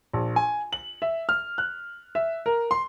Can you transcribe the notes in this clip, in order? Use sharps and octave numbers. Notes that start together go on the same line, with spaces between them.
A#1
G#5
F#7
E5
F6
F#6
E5
A#4
C6